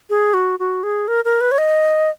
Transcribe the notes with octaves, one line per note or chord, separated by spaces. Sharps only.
G#4
F#4
F#4
G#4
A#4
A#4
B4
C#5
D#5